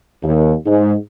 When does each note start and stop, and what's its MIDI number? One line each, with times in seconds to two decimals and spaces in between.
0.23 0.55 39
0.66 0.95 44